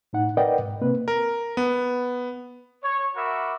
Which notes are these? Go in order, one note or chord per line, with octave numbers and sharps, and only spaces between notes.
A2 D#4 F#5
A#4 B4 D5 D#5 F#5 G5
G#2
C3 A#3 C4 B4
A#4
B3
C#5
F#4 A#4 E5 B5 D6